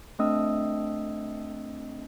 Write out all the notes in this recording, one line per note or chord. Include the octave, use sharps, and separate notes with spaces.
A3 C4 D4 D#5 D#6 E6